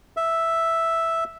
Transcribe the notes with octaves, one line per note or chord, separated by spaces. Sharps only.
E5